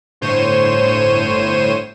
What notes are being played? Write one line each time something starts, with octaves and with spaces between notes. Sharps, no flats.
G1 A2 C5 C#5 D#7 E7